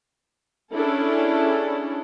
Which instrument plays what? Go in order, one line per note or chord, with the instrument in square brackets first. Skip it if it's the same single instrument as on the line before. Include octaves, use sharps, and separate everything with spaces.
[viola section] C#4 D4 E4 G#4 A4